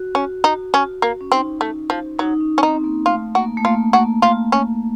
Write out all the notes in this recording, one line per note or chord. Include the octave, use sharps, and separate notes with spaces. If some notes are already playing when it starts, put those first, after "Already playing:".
Already playing: F#4
C#4
D#4
C#4
A#3
C#4
C4 D#4
A3
F3
F#3 D#4
C#4
C#4
C4 D#4
A#3
A3 F4
A#3 F#4
A3
A#3 F4
A#3 F#4
F4
C#4